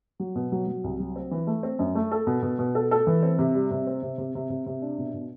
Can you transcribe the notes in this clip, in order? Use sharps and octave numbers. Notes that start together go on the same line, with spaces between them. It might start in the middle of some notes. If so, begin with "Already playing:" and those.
F#3
B2
F#3
F#3
C2
F#3
C4
E3
A3
C4
F#2
A3
A4
B2
B2
B2
A4
A4
E3
C4
C3
G3
C3
C4
C3
C3
C3
C3
C3
D4
B2
B2